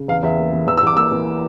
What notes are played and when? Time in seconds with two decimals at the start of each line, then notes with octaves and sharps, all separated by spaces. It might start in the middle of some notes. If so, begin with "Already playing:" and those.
Already playing: C#3
0.08 E2 F5
0.23 E2 E5
0.38 A#3
0.53 E3
0.67 E2 E6
0.77 E6
0.82 E2 D6
0.97 A#3 E6
1.12 E3